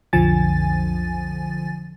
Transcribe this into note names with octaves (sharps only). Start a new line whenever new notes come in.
B1 F2 D3 F3 G#5 A6